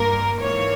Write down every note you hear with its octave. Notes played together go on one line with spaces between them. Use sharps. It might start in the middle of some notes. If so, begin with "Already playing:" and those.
Already playing: G2 G3 A#3 A#4
G#2 E3 A#3 C#5